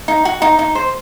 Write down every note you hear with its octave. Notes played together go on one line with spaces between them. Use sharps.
D#4
F#4
D#4
D#4
C5